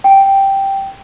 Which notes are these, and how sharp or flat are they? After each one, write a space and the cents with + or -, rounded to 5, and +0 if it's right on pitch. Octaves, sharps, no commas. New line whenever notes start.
G5 -5